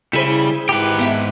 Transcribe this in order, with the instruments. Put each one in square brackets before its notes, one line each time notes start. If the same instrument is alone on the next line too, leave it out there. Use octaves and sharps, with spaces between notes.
[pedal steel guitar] C#3 [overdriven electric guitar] G3 B5 [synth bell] E4 G#4 C5
[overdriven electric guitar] G#2 G5 [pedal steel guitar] G4 B4 [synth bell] D6
[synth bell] B3 E5